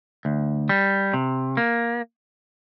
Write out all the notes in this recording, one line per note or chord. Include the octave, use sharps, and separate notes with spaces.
D2
G3
C3
A#3